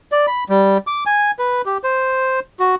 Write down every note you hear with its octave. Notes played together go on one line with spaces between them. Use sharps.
D5
B5
G3
D6
G#5
B4
G4
C5
F#4